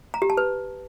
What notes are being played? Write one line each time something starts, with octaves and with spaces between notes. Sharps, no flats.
A#5
G4
A5
B4